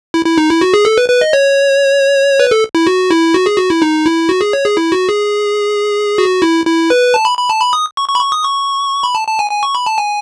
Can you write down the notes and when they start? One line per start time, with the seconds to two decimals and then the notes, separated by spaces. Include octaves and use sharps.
0.14 E4
0.25 E4
0.38 D#4
0.50 E4
0.61 F#4
0.74 G#4
0.85 A4
0.98 B4
1.10 B4
1.21 D#5
1.33 C#5
2.40 B4
2.51 A4
2.75 E4
2.87 F#4
3.11 E4
3.34 F#4
3.46 G#4
3.58 F#4
3.70 E4
3.82 D#4
4.06 E4
4.29 F#4
4.41 G#4
4.53 C#5
4.64 G#4
4.77 E4
4.92 F#4
5.09 G#4
6.18 F#4
6.42 E4
6.66 E4
6.90 B4
7.14 A5
7.25 B5
7.38 B5
7.50 A5
7.61 B5
7.73 D#6
7.97 C#6
8.09 C#6
8.15 B5
8.21 C#6
8.32 D#6
8.43 C#6
9.03 B5
9.15 A5
9.28 A5
9.39 G#5
9.51 G#5
9.63 C#6
9.75 B5
9.86 A5
9.98 G#5